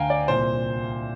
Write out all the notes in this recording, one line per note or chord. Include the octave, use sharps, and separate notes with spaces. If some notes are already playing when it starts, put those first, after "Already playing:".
Already playing: D2 D3 F5 G5 G#5 A#5
D5
C2 A#2 C5